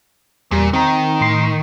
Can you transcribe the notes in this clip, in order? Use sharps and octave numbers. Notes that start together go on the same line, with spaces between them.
E2 A#2 G3
D#3 C4 A#5
A2 C6 C7